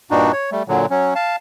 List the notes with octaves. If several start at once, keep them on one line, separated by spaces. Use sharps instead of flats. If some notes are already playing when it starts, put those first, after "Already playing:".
G2 A#2 D4 D#4 F#4
C#5
G3 A3
A#2 D3 F#3
F#3 C#4
F5 A5